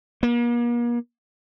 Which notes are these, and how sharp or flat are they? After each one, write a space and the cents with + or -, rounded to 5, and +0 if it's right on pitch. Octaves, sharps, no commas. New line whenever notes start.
A#3 +40